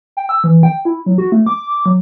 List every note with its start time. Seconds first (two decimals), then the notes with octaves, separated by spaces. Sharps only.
0.17 G5
0.29 E6
0.44 E3
0.63 G5
0.85 E4
1.06 F#3
1.18 F#4
1.32 A3
1.47 D6
1.86 F#3